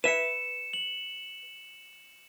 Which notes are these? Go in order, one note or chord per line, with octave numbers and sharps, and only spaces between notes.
B4 E5 C#7 E7
F#7